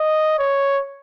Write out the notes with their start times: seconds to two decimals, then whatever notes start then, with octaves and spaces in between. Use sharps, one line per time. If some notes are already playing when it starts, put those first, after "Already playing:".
Already playing: D#5
0.39 C#5